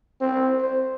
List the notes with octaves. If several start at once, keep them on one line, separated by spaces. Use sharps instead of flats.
C4
C5